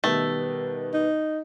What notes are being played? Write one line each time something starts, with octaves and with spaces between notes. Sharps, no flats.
B2 D#3 G3 A3 B4
D#4